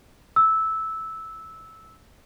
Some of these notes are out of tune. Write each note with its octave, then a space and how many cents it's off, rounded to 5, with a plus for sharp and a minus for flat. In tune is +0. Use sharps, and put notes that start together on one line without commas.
E6 -10